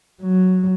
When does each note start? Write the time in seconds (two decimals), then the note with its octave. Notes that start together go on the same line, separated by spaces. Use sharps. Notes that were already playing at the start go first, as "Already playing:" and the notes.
0.22 F#3